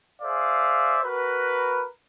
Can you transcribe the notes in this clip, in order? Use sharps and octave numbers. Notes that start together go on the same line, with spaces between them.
G#4 C5 D5 E5 F5
F#4 A#4 B4